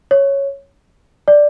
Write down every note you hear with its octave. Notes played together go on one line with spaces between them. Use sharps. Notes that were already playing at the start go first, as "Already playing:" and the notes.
C#5
D5